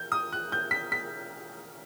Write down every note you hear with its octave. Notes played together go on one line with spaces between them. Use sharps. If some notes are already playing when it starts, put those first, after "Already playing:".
Already playing: G6
D#6
F#6
G6
B6
B6